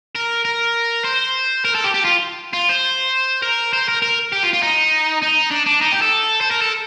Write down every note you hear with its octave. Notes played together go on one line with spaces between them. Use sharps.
A#4
A#4
C5
A#4
A4
G4
G4
F4
F4
C5
A#4
C5
A#4
A#4
G4
F4
F4
D#4
D#4
D4
D4
D#4
G4
A4
C5
A#4
A4